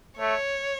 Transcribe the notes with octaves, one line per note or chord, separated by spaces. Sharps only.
A3 C#5